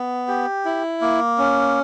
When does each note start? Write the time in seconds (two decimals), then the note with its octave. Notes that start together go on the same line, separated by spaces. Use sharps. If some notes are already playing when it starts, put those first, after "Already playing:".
Already playing: B3
0.28 G4
0.65 E4
1.01 A#3
1.38 C#4